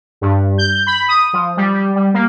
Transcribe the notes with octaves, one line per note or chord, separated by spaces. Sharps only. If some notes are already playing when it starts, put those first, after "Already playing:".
G2
G6
B5
D#6
F3
G3
G3
G3
A#3